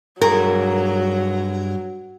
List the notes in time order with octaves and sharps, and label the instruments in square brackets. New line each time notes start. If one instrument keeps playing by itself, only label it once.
[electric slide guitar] G2 G#4 [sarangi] F#3 [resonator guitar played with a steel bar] A#4